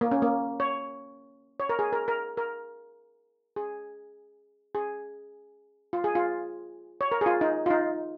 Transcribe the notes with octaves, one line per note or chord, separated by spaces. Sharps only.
A#3
C#4
A#3
C#5
C#5
A#4
G#4
A#4
A#4
A#4
G#4
G#4
F4
G#4
F4
C#5
A#4
G#4
F4
D#4
F4
D#4